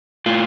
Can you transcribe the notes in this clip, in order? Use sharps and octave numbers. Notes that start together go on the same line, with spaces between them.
A2 F4